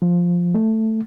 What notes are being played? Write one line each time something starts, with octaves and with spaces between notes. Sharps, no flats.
F3
A3